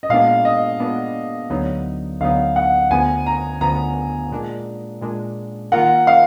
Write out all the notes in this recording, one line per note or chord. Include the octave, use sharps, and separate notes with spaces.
D#5
A#2 G#3 B3 D4 F5
D#5
A#2 G#3 B3 D4
D2 D3 F#3 B3 D#4
D2 D3 F#3 B3 D#4 F5
F#5
D2 D3 F3 B3 G#5
A#5
D2 D3 F3 B3 A#5
A#2 G#3 D4
A#2 G#3 D4
D#3 A#3 F4 A#4 F#5
F5